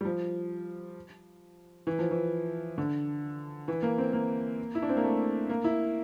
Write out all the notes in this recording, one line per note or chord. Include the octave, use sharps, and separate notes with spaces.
G3
F3
E3
F3
E3
D3
E3
A#3
C4
A#3
E4
D4
C4
A#3
A3
A#3
E4